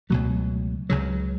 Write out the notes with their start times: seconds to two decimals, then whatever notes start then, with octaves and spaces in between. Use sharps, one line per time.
0.10 C#2 B2 F#3 A3
0.90 C#2 C#3 F#3